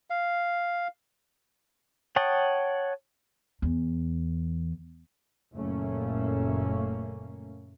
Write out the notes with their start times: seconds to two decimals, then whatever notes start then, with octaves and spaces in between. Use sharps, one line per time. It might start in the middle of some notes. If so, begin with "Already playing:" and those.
0.10 F5
2.16 C#5 F#5 G5 A5 D#6
3.62 E2
5.54 F#1 A#2 A3 A#3 C#4